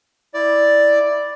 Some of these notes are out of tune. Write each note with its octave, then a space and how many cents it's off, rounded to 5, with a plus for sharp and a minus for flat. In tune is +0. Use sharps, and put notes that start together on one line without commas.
E4 -5 D5 +0